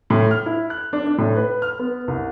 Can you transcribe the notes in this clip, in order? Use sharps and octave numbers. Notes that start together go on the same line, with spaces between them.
A2
F6
E4
F#6
D4
D4
A2
B4
F6
B3
C2